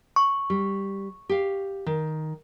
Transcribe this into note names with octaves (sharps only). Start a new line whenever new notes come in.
C#6
G3
G4 F5
D#3